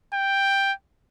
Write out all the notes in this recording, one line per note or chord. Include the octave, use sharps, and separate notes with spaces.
G5